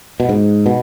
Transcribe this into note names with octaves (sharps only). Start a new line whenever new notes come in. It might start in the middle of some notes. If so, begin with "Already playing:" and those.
B2
G#2
B2